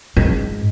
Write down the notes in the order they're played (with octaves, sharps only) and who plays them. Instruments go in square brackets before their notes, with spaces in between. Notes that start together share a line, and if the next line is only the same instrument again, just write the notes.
[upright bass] G#2